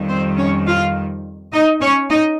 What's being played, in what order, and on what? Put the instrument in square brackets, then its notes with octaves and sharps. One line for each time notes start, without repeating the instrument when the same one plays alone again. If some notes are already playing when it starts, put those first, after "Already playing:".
Already playing: [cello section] F2 D#3 G3
C4 C5
C#4 C#5
F4 F5
D#4 D#5
C#4 C#5
D#4 D#5